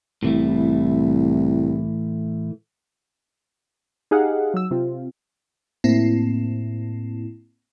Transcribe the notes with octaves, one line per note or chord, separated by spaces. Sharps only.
C2 A2 E3 A3
D#4 G4 G#4 D#5 F5 F#5
F#3 E6
C3 C4 F4
A2 A#3 C4 E4